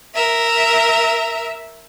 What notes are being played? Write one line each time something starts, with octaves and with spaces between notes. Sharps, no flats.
A#4 E5